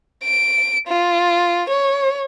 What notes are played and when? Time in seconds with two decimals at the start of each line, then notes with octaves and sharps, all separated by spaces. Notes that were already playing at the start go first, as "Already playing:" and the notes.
0.24 D7
0.87 F4
1.69 C#5